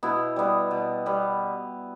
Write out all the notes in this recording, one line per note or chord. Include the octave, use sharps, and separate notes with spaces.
B2 B3 E4
G3 B3
B2
G3 B3